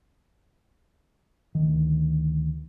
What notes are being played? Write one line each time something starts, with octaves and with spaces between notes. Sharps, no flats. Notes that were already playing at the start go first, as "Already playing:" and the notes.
D2 D#3